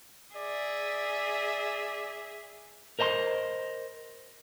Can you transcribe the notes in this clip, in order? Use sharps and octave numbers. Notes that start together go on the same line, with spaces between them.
G#4 D5 E5
A#4 C5 D#5 A5 C6